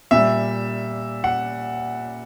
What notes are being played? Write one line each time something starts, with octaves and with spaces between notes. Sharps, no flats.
A#2 G3 E5
F#5